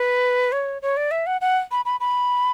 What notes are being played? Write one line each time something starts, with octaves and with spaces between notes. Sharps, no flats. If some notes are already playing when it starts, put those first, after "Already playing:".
Already playing: B4
C#5
C#5
D5
E5
F#5
F#5
B5
B5
B5